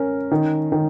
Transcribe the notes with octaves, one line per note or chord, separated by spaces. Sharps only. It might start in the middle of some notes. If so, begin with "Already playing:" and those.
Already playing: C#4 A#4
D#3
D#3